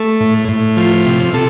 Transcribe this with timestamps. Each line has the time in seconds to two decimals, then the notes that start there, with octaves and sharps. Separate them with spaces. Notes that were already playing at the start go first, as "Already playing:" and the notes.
Already playing: A3
0.20 A2
0.48 A2
0.77 F3
1.06 C3
1.34 C3 A4